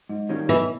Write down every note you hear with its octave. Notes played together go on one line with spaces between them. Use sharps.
G#2
D#3 G3 A#3 C#4
B2 E3